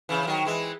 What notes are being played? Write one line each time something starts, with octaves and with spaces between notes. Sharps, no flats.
C#3 E3
E3
D#3 F#3
E3 G#3